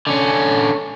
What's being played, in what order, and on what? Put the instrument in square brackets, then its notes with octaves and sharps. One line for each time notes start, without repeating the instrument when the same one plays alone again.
[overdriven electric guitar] D3 C#4